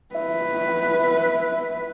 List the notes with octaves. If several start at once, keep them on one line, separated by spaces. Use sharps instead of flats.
E4 B4